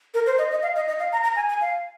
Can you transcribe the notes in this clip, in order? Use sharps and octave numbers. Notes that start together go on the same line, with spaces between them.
A#4
C5
D#5
D#5
F5
D#5
D#5
F5
A#5
A#5
G#5
G#5
F5